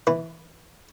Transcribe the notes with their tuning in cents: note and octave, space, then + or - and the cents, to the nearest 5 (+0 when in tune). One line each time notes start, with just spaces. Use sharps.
E3 -10 B4 +0